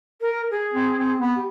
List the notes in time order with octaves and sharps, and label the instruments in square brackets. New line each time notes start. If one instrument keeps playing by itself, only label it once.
[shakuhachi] A#4
G#4
[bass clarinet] C4
C4
B3
[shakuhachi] G4